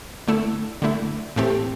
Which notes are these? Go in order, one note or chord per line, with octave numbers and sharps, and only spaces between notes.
D3 A3 E4
D3 A3 E4
A2 E3 A3 C4 G4